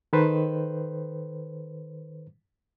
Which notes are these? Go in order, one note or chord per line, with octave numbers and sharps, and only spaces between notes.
D#3 A4 B4 C5